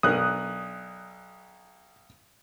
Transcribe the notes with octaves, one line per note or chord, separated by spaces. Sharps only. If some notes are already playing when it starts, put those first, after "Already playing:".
B1 D4 A#4 D#6 F#6